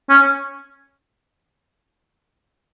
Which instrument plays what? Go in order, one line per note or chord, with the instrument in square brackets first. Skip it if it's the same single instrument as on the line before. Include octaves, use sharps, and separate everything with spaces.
[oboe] C#4